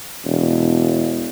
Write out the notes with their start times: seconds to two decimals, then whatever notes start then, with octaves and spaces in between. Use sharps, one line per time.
0.25 E1